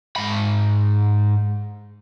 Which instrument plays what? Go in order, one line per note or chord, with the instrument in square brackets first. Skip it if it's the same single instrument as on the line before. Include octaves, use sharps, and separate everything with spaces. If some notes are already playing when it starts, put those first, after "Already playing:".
[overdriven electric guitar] G#2 B5